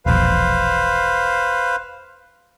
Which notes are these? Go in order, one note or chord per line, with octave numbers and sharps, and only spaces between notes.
E1 A#1 B4 C5 F5